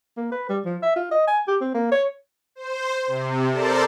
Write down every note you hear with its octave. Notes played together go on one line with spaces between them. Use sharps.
A#3
B4
G3
F3
E5
F4
D#5
G#5
G4
C4
A#3
C#5
C5
C3
A4 A#4 C5 D5 A5